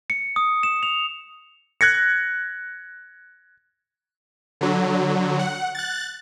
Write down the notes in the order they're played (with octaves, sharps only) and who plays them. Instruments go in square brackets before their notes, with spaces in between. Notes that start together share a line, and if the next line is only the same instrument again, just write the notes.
[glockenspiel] C#7
D#6
E7
F7
[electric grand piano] F#6 G#6 A#6 C#7
[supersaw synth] D3 F#3
F#5
F#6 A6